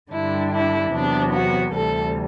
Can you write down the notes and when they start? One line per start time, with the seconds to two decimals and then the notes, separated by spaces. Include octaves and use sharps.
0.12 G2 D3 G3 D4 E4
0.52 E4
0.92 E2 C3 F#3 B3 D4
1.33 F#4
1.73 D2 C3 E3 G3 A4